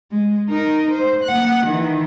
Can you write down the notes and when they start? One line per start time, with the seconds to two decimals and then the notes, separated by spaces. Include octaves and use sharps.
0.11 G#3
0.50 D#4 A#4
0.90 C5
1.24 A#3 F#5
1.66 D#3 E3